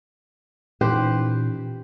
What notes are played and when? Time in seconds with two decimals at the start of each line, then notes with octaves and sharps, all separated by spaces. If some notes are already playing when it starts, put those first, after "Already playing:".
0.81 A#2 E3 C#4 D#4 G4 B4 C5